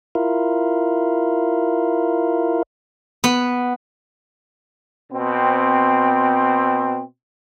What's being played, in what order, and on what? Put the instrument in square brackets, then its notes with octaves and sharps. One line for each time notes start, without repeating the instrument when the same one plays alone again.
[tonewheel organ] E4 F4 A#4
[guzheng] B3
[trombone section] B2 C4